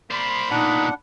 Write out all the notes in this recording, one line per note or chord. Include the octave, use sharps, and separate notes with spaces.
A#3 C5 D5 B5
B1 A#2 D4 D#4 F#5